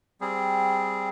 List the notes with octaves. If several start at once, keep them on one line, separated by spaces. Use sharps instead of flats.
G3 C4 G#4